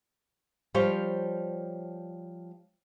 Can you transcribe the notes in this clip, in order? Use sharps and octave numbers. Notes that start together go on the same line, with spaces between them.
F3 G3 C5 C#5 F5